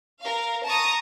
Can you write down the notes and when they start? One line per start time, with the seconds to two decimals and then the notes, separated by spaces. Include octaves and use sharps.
0.21 A#4 F5
0.65 A5 A#5 C#6 D#6